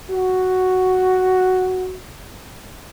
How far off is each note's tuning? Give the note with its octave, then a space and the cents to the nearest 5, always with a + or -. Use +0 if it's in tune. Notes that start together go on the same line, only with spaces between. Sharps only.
F#4 +5